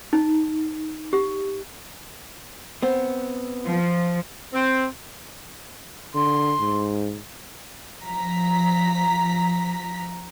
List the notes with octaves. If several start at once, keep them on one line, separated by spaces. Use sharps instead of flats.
D#4
G4
B3 C4
F3
C4
D3 C6
G#2
F3 A#5 B6